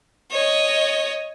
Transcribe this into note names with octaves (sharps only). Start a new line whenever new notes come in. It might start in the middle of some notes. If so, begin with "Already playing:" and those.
C#5 D#5